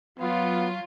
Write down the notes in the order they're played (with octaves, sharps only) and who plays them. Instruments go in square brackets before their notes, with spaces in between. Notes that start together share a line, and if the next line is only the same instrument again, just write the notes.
[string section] F#3 F4 [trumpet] B3